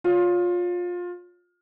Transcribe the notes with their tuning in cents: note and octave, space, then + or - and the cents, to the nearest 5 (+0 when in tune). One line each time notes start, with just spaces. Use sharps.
F4 +20 C#5 +25